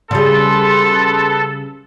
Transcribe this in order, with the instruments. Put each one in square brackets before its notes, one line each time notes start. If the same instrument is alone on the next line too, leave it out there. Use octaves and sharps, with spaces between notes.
[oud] C#3 G3 [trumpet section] B3 A4 [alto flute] C6